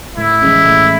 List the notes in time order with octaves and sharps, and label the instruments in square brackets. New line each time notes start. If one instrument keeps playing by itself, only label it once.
[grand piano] A2 [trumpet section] E4
[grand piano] E3 G#3 C#4
A2